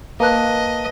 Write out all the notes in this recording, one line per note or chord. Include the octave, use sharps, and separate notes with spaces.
A#3 B4 D#5 A5 F#6